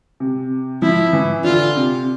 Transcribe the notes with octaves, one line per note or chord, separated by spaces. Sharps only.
C3
F3 E4
E3
D3 F4
C3